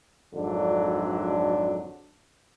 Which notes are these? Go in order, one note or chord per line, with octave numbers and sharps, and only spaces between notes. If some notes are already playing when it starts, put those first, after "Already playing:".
G#1 F2 D3 F#3 D4